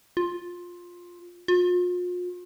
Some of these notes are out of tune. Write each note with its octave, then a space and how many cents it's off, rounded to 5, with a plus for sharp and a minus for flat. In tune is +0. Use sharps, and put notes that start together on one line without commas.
F4 +10
F4 +40